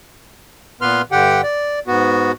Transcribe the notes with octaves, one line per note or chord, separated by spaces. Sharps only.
A#2 B3 B4 C6 F6
G2 D3 G4 F#5 G5
D5
G#2 B3 F#4